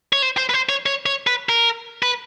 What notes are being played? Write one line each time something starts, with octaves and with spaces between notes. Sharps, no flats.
C#5
C5
C5
B4
C5
C#5
C#5
C#5
B4
A#4
B4